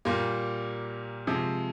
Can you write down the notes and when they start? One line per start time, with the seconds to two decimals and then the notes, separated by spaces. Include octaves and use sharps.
0.05 A#2 G3 A#3
1.27 C3 F3 G#3